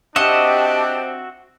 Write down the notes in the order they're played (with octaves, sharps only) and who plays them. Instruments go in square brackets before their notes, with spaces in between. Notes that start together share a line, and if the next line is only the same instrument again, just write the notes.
[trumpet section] C4 D4 [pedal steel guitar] F#4 E5 F#5 [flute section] G4 A5 [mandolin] D#5